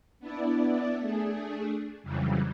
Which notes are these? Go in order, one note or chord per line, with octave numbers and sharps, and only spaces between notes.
B3 D4 E4 D5
A3 D4 G#4
F2 C#3 E3 F#3 G3